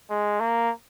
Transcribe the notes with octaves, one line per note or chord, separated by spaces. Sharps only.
G#3
A#3